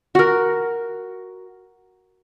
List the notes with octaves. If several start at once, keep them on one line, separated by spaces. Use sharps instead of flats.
F#4 A#4